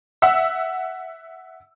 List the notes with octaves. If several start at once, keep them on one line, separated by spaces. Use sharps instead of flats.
E5 F#5 E6